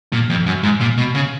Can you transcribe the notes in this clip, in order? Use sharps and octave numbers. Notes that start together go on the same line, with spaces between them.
A#2
F2
F#2
G#2
A#2
B2
C#3